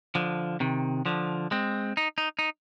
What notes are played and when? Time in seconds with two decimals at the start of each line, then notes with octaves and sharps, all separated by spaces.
0.15 D3 F3
0.60 C3 D#3
1.06 D3 F3
1.51 G#3 C4
1.97 D#4
2.18 D#4
2.39 D#4